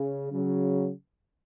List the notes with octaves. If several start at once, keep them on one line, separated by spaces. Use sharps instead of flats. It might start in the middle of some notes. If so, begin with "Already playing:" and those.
Already playing: C#3
C#3 F#3